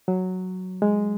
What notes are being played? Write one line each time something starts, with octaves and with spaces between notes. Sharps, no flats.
F#3
G#3